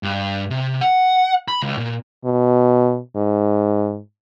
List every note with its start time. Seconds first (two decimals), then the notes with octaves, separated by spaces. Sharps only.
0.03 G2
0.50 C3
0.81 F#5
1.48 B5
1.62 C#2
1.78 A#2
2.25 B2
3.16 G#2